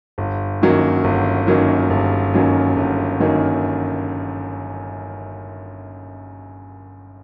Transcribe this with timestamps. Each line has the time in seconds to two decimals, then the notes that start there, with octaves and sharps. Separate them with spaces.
0.18 G1
0.62 F#2 D#3 F#3 A#3
1.04 G1
1.47 F#2 D#3 F#3 A#3
1.90 G1
2.34 F#2 D#3 F#3 A#3
2.77 G1
3.20 F#2 D#3 F#3 A#3